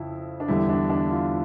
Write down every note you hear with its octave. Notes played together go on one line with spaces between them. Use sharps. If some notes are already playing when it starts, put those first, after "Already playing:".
Already playing: F2 C#3 F3 E4
D4
E2 D3 G3 E4
D4
D4
F4